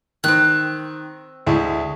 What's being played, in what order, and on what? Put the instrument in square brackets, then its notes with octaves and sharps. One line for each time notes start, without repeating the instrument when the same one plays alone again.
[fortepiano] D#3 [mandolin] C4 F#6
[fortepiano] D2 G#3 E4